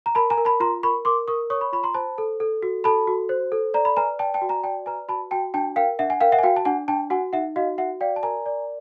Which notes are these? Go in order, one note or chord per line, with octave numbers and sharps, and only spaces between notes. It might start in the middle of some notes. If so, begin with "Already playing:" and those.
A#5
A#4 A5 B5
G#5 A#5
A#4
A5 B5
F4 A#5 C6
A#4 B5 C#6
A#4 C6 D6
A#4 C#6 D#6
C#5 C#6 D#6
B5 C#6
F4 B5 C#6
A#5 C6
C5 A5 B5
A4
A4
F#4
A4 A5 B5
F#4
C5
A4
D5 A#5
B5
B4 G#5 A#5
D5 G5 A5
G5 A5
F#4
G#5 A#5
D5 G5 A5
B4 G#5 A#5
F#4 A5 B5
F#4 G5 A5
D4 G5 A5
A#4 F5 G5
D4 E5 F#5
F#5 G#5
A#4 F5 G5
E5 F#5
G#5
F#4 F5 G5
A5
D4 F#5 G#5
D4 G5 A5
F#4 F#5 G#5
D#4 E5 F#5
F#4 D#5 F5
F#4 E5 F#5
D5 F5 G5
A5
A#4 G#5 A#5
D5